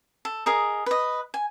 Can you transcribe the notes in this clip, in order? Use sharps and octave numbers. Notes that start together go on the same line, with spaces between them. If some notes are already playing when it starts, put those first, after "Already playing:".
A4
G#4 A#4 D#5
B4 D#5
G#5